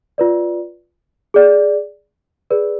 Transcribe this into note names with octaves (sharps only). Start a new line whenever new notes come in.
F4 B4 D5
G#4 D5
G#4 B4 D5